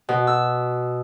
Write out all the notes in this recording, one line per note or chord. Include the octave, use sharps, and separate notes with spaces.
B2
E6